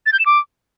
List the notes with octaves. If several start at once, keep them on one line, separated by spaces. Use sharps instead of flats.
A6
G6
E7
D6